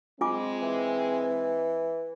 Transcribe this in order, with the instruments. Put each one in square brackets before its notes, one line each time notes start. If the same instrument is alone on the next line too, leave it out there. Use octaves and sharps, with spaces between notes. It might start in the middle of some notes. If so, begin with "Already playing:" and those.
[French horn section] G#3 C4 [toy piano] F4 G#5 D6
[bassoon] E3